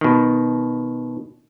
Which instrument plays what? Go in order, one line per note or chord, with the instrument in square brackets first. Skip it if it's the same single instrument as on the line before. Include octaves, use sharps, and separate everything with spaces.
[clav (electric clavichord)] B2 D#3